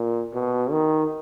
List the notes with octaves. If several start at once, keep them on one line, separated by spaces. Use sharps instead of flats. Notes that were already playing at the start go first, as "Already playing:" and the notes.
Already playing: A#2
B2
D#3